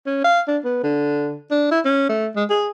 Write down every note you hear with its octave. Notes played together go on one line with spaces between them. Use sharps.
C#4
F5
D4
B3
D3
D4
E4
C#4
A3
G#3
G#4